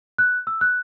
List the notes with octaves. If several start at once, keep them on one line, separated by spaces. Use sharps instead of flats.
F#6
E6
F#6